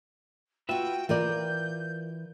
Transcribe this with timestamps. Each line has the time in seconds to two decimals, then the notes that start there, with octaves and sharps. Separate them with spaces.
0.69 F4 F#4 B4 E5 G5
1.09 E3 F4 A#4 D5 G6